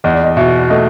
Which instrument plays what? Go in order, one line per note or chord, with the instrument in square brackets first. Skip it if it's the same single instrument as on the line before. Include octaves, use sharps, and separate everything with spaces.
[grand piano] E2 [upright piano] D#5
[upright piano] D5
D#5
[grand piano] B2 [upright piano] E5
[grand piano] A3 [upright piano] D#5